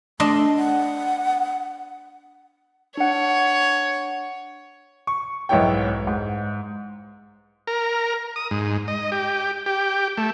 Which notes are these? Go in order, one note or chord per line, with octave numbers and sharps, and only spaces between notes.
A3 D4 D#5 C6
F#5
D4 C#5 F#5
C#6
B1 G#2 B3 E4 C#5 G5
G#2
A#4
D#6
G#2
D#5
G4
G4
A3